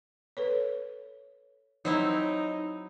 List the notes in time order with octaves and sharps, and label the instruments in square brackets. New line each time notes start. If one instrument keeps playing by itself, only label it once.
[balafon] A4 B4 C#5
[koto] F#3 C4 E4 [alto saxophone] D#4